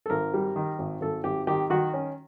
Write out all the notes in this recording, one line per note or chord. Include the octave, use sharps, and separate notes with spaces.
A4
G#1 A#4
G3
D#3
G#1
G#1 A4
G#1 G4
D#3 G4
D#3 F#4
C#4